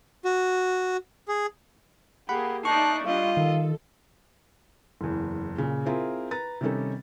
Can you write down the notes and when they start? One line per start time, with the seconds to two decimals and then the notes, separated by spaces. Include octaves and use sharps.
0.25 F#4
1.28 G#4
2.29 A#3 G4 G#4 F#5 B5
2.65 D#4 D5 E5 A5 C#6 F#6 C7
3.05 G3 D4 F4 D#5 F5
3.37 D#3 A4
5.01 F#1 E2
5.58 A#2 C#3
5.86 C4 E4 F4 G#4 A#4
6.31 B4 A#5 A6
6.61 C3 D#3 G3 C#4 D#4 A4